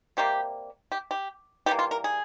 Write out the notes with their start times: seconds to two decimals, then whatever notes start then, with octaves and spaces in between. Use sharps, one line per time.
0.17 C3 G3 A#3 G4
0.92 G4
1.11 G4
1.66 E3 G3 A#3 G4
1.79 F4
1.91 A#4
2.04 G#4